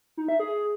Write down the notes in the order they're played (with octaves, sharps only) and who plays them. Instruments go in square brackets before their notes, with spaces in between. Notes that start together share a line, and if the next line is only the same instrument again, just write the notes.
[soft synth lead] D#4
E5
G#4